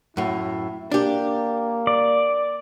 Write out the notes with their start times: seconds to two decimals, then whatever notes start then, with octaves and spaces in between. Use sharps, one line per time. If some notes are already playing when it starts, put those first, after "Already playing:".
0.17 F#2 A2 E4
0.92 A#3 D4 G4
1.87 D5